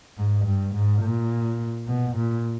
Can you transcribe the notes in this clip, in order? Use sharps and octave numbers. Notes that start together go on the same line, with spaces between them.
G#2
G2
G#2
A#2
B2
A#2